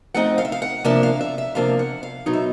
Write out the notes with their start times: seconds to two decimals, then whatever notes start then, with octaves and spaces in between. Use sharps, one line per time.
0.14 F3 A3 C4 D#4 F#5
0.38 F5
0.45 E5
0.52 F5
0.62 F#5
0.84 C3 F3 A#3 D4 E5
1.03 F5
1.21 E5
1.38 E5
1.55 C3 F3 A#3 D4 F5
1.79 F#5
2.03 F5
2.26 B2 F#3 B3 D#4
2.33 E5